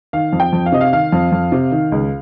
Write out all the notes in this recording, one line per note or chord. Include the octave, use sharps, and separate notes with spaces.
D#3 F5
F2
G5
F2
F5
C3 D#5
F5
D#3 F5
F2
F2
C3
D#3
C#2